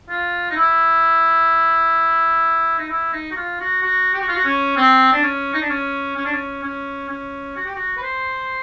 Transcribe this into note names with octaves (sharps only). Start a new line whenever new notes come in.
F4
D#4
E4
D#4
E4
D#4
F#4
F4
F#4
F#4
G4
F#4
F4
F#4
C#4
C4
D4
C#4
D#4
D4
C#4
C#4
D4
C#4
C#4
C#4
F#4
G4
F#4
B4
C5